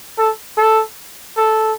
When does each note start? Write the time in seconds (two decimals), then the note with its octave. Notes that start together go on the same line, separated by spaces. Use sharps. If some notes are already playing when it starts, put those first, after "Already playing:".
0.18 A4
0.57 A4
1.37 A4